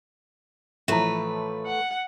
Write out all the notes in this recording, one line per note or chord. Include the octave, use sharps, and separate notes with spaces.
A2 E3 F3 A3 B4 E5 A#5
F#5